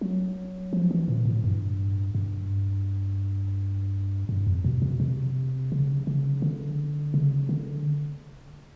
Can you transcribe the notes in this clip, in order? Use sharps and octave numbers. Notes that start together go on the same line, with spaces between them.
F#3
F3
E3
A#2
A2
G2
G2
G2
F2
B2
C3
C3
C#3
C#3
D3
C#3
D3